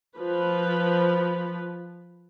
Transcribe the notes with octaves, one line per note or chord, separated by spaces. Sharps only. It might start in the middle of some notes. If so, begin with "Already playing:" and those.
F3 B4